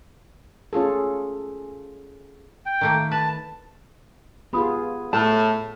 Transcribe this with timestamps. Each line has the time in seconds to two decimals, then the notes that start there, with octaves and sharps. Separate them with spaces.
0.73 C#4 F4 G#4 A4
2.66 G5
2.81 D#3 A3 A#3
3.11 B4 A5
4.53 B3 F4 G4 G#4 B5 D#6
5.13 A2 A5